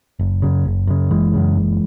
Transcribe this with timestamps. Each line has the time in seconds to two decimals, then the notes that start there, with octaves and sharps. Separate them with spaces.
0.19 F#1
0.42 F#2 C#3
0.65 F#1
0.87 F#2 C#3
1.11 F#1 E3 G#3
1.34 F#2 C#3
1.56 F#1